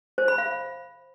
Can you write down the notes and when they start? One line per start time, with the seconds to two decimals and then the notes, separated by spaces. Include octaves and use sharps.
0.18 C5
0.28 B5
0.38 F5